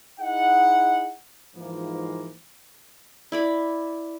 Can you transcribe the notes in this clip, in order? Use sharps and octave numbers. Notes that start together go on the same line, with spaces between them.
D#4 E4 G#4 D#5 F#5
G#2 E3 F3 A#3
E4 D5 B5